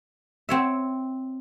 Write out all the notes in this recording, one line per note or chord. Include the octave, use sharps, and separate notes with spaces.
C4 C#5 E5